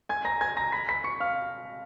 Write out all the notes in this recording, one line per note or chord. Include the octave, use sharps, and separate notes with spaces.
G#5 G#6
A#5 A#6
G#5 G#6
A#5 A#6
B5 B6
B5 B6
C#6 C#7
F5 F6